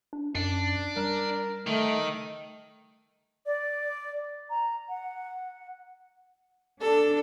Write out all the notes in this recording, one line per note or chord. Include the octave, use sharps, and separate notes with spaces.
D4
F#2 D4
G3 A#4
D#3 A3
D5
A#5
F#5
D4 A4